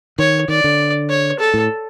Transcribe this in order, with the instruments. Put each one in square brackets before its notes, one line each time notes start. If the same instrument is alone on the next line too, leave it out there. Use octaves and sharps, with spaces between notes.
[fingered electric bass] D#3 [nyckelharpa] C#5
[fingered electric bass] D#3 [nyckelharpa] D5
[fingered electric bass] D3
[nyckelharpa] C#5
A4
[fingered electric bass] A2